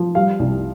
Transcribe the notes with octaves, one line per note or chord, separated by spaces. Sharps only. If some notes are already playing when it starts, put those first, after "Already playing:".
Already playing: F3
G3 F5
C2